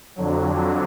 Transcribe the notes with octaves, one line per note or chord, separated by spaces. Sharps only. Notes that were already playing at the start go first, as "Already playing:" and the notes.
F2 D3 F#3